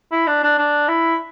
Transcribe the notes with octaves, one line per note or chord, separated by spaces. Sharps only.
E4
D4
D4
D4
E4